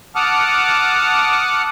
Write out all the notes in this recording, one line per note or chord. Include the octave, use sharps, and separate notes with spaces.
F#5 A5 D6 D#6 F6